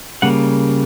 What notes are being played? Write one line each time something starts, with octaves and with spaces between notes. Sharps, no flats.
C#3 G3 A#3 F#5